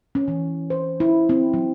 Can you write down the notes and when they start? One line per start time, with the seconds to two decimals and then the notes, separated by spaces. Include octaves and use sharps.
0.15 C#4
0.28 E3
0.70 C5
1.00 E4
1.29 C4
1.54 F#3